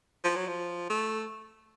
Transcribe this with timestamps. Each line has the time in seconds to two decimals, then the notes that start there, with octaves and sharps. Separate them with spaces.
0.24 F3
0.36 F#3
0.48 F3
0.90 A3